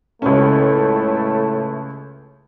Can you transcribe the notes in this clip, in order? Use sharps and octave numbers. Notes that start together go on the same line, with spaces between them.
C#2 A2 A3 C#4